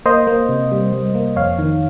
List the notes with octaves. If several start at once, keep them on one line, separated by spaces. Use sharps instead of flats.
A#3 C5 D#5
A#3
C3
G3
G3
A#3
F2 C#5 F5
D#3